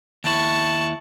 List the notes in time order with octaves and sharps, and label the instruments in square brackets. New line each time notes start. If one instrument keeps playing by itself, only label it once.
[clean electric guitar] D#2 E4 [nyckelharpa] A5 C#6